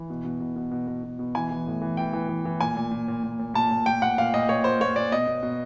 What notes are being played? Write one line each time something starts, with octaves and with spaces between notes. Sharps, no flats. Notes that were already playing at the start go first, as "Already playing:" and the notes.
Already playing: E3
B2
B2
B2
B2
B2
B2
B2
B2
E3 G#5
E3
A2
E3
E3 G5
E3
E3
E3
A#2 G#5
A#2
A#2
A#2
A#2
A#2
A#2 A5
A#2
A#2 G5
A#2 F#5
A#2 F5
A#2 D#5
A#2 C#5
A#2 C5
A#2 C#5
A#2 D5
B2 D#5
B2
B2